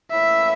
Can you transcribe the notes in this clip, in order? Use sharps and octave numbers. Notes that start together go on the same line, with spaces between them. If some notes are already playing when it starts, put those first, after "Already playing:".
A2 E3 A#3 C#4 E4 E5